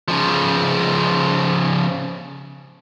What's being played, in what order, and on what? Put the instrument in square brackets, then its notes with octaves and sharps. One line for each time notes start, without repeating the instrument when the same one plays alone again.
[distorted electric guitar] C#3 F3